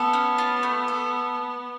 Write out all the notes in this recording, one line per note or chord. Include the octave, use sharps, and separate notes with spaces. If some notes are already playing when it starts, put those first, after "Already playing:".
Already playing: B3 A4
C#4
F4
A3
A4